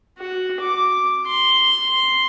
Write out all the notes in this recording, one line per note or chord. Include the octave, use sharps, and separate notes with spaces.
F#4
D6
C6